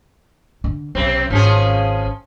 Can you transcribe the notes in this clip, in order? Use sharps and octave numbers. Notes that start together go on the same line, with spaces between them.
D3
B1 C3 F#3 C4
G#1 F3 C#4 G#4